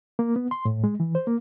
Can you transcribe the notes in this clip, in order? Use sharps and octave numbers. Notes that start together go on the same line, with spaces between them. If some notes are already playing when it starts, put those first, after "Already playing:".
A#3
B3
C6
A2
G#3
E3
C5
A#3